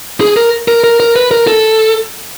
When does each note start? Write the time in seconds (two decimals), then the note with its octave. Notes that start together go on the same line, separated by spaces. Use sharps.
0.21 G#4
0.37 A#4
0.68 A#4
0.84 A#4
1.00 A#4
1.16 B4
1.31 A#4
1.47 A4